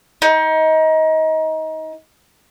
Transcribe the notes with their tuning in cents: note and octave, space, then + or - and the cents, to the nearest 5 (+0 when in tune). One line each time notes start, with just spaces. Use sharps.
D#4 +25